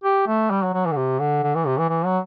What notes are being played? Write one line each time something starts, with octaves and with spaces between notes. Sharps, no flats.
G4
A3
G3
F#3
F#3
E3
D3
C3
D3
D3
E3
C3
E3
E3
F#3